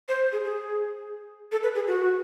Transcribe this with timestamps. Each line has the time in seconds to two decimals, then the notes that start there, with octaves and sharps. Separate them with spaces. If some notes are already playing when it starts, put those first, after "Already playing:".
0.08 C5
0.32 G#4
0.44 G#4
1.52 A4
1.63 B4
1.75 G#4
1.87 F#4